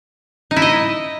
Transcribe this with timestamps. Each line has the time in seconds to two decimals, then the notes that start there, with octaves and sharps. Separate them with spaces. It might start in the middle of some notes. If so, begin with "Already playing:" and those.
0.51 D#4
0.56 E4
0.62 D#5